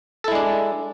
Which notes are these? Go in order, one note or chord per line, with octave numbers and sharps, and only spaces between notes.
G#3 D4 E4 A4